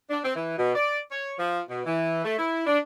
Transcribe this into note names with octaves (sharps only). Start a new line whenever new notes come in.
D4
C4
E3
B2
D5
C#5
F3
B2
E3
A3
E4
D4